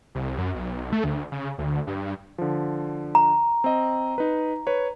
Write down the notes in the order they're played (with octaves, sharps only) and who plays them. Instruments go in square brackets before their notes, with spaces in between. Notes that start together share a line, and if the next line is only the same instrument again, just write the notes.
[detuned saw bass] C2
F#2
B1
A3
D2
C#3
D2
G2
[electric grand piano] D3 F3
[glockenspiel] A#5
[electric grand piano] C4 D#5
D#4 B4
B4 C#5